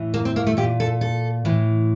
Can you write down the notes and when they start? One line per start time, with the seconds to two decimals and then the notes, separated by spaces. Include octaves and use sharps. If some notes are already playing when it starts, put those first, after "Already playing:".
Already playing: A2 E3
0.14 A#3
0.25 C4
0.36 A#3
0.47 A3
0.57 A#2 G4
0.80 A4
1.01 A4
1.45 A2 E3